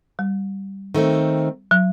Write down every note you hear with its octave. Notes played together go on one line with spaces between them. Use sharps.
G3
D#3 A3 C4
F#3